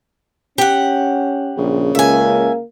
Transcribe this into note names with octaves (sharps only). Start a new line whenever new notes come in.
C#4 G4 F#5
A#1 C#3
C#2 A#3 E5 G#5